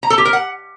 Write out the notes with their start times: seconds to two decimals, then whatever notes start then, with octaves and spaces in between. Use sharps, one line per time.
0.03 A#5
0.10 A4
0.18 G4
0.25 A#4
0.33 F#5